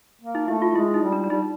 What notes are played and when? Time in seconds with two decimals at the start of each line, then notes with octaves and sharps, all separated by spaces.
0.21 A#3
0.35 D#4
0.48 A3 E4
0.62 F4
0.75 G#3 E4
0.94 D#4
1.02 G3
1.12 D4
1.24 D4
1.30 G3 D#4